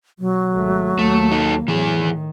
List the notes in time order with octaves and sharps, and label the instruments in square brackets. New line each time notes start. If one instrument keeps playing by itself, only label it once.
[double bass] B2 [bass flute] F#3
[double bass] G#1 A3
[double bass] D#2 A#3 [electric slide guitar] A3
[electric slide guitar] D#4 A4
[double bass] A2 F#3 [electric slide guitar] E3 G#4
[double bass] D#3